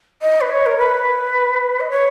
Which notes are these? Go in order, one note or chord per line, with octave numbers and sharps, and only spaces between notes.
D#5
B4
C#5
A#4
B4
D#5
C#5